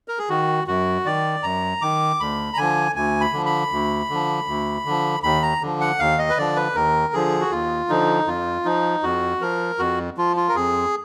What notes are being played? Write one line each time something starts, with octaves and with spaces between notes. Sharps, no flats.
A#4
G#4
D#3 F#4
F#2 F#4
D#3 D5
F#2 A#5
D#3 D6
D2 B5
A#5
D3 F3 G#5
D2 G#5
B5
D3 F3
B5
D2
D3 F3
D2
D3 F3
D#2 B5
A#5
D3 F3
F#5
D#2 F5
D#5
B4
D3 F3 D5
B4
D#2 A#4
D3 F3 G#4
F#4
D#2 F4
D3 F3 D#4
F2 F4
F3 D#4
F2 F#4
F3 A#4
F2 F#4
F3 F4
F4
A#4
F2 G#4